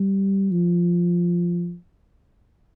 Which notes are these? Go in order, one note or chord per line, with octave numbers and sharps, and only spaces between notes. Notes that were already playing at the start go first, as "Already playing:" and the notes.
Already playing: G3
F3